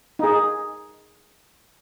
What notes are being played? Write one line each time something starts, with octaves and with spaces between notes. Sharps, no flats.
D#4 G#4